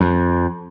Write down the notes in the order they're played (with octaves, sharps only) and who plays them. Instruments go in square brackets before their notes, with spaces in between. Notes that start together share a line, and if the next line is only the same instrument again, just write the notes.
[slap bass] F2